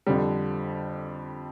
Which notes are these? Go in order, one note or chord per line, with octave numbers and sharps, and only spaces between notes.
F2 D3 G3